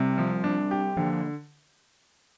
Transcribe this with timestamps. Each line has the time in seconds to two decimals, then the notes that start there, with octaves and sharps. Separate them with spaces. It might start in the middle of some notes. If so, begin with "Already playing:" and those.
Already playing: C3 G3 C4
0.18 F3
0.44 D4
0.71 G4
0.97 D3 F3 A#3